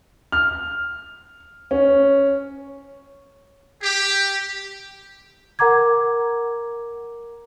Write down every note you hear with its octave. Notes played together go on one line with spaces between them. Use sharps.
F6
C#4
G4
A#4 F#5 A#5 D6 G#6